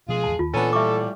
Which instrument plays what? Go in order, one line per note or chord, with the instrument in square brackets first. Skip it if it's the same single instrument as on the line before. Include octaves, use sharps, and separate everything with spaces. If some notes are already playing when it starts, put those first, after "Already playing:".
[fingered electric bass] B2 F3 [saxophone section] G#3 F4 G#4
[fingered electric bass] D1 A1 E2 [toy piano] A5
[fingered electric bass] D#2 [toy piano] F4
[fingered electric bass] A#2 E3 [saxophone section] B3 C#4 D4 [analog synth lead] A4 [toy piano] G#5 A5
[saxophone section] A2 F3 G3 [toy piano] E5 C#6 D6